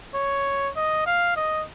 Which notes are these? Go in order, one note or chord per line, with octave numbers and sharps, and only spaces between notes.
C#5
D#5
F5
D#5